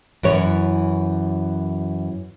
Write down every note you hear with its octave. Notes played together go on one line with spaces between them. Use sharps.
F#2 E3 C#5